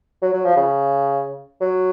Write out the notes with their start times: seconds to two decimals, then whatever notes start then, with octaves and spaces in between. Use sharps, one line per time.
0.22 F#3
0.34 F#3
0.45 F3
0.57 C#3
1.61 F#3